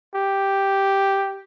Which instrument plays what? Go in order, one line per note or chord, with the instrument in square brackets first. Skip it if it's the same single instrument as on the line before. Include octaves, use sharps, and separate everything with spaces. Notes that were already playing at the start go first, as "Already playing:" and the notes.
[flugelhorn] G4